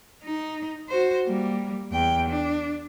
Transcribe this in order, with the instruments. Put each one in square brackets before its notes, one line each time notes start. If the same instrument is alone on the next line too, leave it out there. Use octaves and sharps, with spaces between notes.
[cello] D#4
F#4 C5
G3 A#3
E2 G5
D4